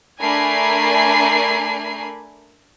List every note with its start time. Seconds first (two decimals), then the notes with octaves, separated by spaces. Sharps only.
0.21 A3 D4 A#4 G#5 B5 C7